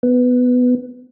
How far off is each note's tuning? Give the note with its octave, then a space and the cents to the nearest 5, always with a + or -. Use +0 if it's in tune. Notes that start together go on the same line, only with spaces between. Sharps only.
B3 +10